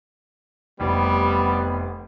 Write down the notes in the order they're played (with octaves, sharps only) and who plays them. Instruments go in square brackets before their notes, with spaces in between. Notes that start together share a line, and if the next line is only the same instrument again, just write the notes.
[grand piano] F1 [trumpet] G3 [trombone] B3